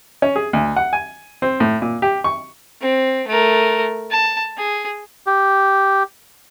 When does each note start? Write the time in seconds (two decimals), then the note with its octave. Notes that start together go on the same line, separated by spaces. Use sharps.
0.22 C#4
0.36 G#4
0.53 D2
0.76 F#5
0.93 G#5
1.42 C4
1.60 A2
1.82 A#2
2.02 G4
2.24 C#6
2.81 C4
3.28 A3 A#4
4.11 A5
4.58 G#4
5.27 G4